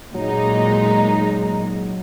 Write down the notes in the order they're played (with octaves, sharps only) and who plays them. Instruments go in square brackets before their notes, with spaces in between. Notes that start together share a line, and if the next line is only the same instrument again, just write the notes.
[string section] A#2 G#3 D#4 [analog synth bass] F#3